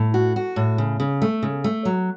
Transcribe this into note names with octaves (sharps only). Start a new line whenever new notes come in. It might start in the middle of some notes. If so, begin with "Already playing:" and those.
Already playing: A2
F#4
F#4
A2
C#3
C#3
A3
C#3
A3
F#3